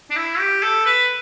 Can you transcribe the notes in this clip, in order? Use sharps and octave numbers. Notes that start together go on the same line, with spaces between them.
D4
E4
G4
A4
B4